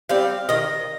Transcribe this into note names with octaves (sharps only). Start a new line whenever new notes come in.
G3 C4 F5
D#3 D#5